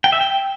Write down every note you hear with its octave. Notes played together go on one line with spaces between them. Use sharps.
G5
E5
G5